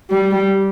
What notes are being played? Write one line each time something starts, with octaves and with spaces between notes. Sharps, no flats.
G3